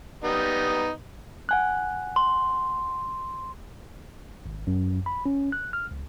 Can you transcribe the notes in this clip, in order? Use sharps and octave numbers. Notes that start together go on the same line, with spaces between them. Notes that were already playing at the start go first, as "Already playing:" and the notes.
G3 B3 D#4
F#5 G#5 F#6
C6
G#1
F#2
B5
C#4
F#6
F6
C#2